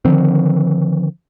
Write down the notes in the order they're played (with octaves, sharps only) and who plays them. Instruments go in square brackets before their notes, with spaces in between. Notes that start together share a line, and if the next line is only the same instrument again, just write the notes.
[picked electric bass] D3 D#3 F3 C4